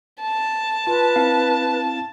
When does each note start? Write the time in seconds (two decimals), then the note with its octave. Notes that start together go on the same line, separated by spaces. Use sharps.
0.22 A5
0.87 F4 B4
1.16 C4 E4 F5